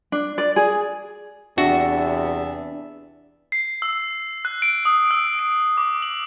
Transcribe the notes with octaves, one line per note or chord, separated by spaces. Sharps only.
D4
D5
G#4
E2 C3 B3 D4 F#4 E5
C7
E6
F#6
D7
D#6
E6
D7
D6
F#7